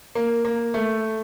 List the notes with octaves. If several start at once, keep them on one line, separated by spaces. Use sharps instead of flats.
A#3
A#3
A3